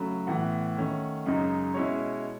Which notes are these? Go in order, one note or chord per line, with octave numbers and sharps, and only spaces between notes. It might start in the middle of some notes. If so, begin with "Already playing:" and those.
Already playing: C#3 F#3 A3 B5
A2 E3 B3 F#5
D#3 A3 C#4
F#2 C#3 G#3 D#4
B2 G#3 C#4 E4 C#5